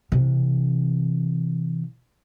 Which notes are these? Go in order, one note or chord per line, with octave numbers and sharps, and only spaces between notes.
C3 E3